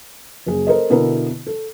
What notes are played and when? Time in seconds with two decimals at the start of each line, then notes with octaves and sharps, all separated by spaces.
0.46 F#1 G#4
0.67 A4 A#4 C5 D#5
0.90 B2 D3 B3 E4 A#4
1.47 A4